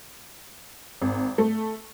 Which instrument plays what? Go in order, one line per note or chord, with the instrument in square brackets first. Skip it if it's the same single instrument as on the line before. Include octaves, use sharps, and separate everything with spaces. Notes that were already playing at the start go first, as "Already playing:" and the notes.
[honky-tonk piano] G#1
A3